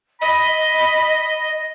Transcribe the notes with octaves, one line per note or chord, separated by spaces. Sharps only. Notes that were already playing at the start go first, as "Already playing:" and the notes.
D#5 B5